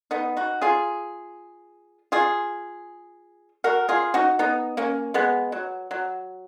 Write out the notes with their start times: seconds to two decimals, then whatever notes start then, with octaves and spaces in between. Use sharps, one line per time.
0.11 B3 D#4
0.37 D#4 F#4
0.61 F4 G#4
2.12 F4 G#4
3.64 F#4 A#4
3.89 F4 G#4
4.14 D#4 F#4
4.39 B3 D#4
4.77 A#3 C#4
5.14 G#3 B3
5.52 F#3
5.91 F#3